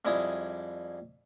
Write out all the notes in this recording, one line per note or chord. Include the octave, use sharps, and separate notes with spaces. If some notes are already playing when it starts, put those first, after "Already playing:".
F2 G3 G#3 E4 G#5 D#6